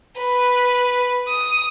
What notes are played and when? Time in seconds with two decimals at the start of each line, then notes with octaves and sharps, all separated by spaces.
0.18 B4
1.28 D#6